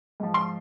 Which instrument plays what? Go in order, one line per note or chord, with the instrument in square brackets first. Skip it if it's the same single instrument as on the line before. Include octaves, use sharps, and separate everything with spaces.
[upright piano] G#2 F3
C6